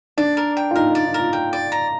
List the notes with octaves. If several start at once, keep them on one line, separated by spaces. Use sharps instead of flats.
D4 D5
A#4
G5
F4
D#4 A#4
D#4
D5
D#4
F4 A#4
G5
D5
A#5